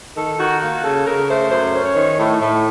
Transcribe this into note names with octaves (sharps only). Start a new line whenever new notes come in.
D#3 A4
D#3 F#4
A#3 F#4
C#3 A4
C#3 A#4
A3 C5
F#2 C5
C#4
C#5
D#3
A2
A2